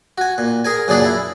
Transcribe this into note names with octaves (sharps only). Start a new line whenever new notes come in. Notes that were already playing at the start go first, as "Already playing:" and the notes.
F#4 G#5
A#2
G#4 A#4 G#5
F#2 A#2 C#3 D4 G#4 D5
E4